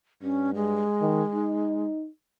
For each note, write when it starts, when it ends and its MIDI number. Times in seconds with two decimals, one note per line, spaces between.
0.22 0.88 43
0.22 0.50 61
0.55 1.86 56
1.01 1.22 51
1.34 2.08 63